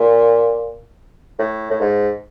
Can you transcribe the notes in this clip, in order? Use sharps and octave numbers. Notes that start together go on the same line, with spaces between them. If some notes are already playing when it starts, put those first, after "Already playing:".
Already playing: A#2
A2
A2
G#2